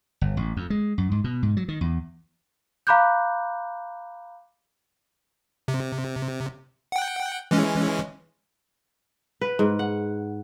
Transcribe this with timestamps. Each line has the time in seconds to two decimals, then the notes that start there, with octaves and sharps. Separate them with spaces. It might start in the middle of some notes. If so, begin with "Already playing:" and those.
0.21 G1
0.37 A1
0.57 F2
0.70 G#3
0.98 F#2
1.12 G#2
1.24 B2
1.43 G#2
1.57 F#3
1.68 D#3
1.81 E2
2.87 F5 A#5 B5 D6 F#6 G6
5.68 C3
6.92 F#5 G5
7.51 E3 G#3 C#4
9.41 B4
9.59 G#2
9.79 F#5